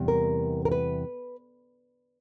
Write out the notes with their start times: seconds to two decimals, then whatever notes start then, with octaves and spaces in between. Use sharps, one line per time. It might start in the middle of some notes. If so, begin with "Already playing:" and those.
Already playing: E2 C3 G3
0.08 A#4
0.65 A#4
0.72 B4